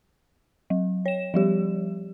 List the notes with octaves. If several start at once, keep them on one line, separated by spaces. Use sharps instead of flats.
F#3
C#5 E7
F3 G3 G4